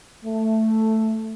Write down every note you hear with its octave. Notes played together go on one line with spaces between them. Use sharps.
A3